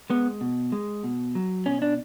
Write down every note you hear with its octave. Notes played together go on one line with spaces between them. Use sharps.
G#3 B3
B2
G#3
B2
F#3
B2 C#4
D4